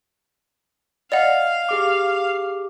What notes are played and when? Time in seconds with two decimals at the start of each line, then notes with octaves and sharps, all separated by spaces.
1.12 D5 D#5 F5 F#5
1.69 G4 G#4 D6